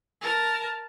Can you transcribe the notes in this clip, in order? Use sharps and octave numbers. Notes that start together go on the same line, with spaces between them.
A#4 A5